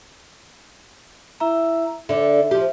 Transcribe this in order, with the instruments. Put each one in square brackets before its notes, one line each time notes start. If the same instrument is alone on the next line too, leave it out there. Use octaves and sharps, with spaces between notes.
[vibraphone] E4 E5 A#5
[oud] D3 D4 [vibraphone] E5
[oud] F3 G4